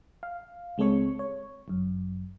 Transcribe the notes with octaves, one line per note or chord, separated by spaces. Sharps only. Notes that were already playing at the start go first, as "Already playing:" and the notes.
F5
C#2 G#3 C4 A4 C#5 C#6
C#5
G1 F#2